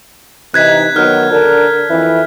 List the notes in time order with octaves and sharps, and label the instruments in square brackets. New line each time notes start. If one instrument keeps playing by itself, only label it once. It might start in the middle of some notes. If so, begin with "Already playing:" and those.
[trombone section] C3 E3 D#4 [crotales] F#6 G#6 B6
[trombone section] D#3 F#3 B3 [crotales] F6
[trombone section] D3 D4 A#4
F2 E3 E4